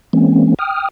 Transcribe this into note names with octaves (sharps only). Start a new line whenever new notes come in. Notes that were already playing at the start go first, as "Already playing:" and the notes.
E3 G#3 A#3 C4 C#4
G5 D#6 F6